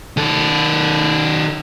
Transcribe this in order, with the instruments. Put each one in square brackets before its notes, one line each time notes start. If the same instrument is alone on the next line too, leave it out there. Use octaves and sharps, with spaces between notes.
[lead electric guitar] D#3 A4